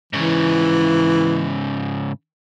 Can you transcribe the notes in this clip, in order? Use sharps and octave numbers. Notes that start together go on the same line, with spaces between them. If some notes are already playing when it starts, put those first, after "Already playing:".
G#2 C#3 E3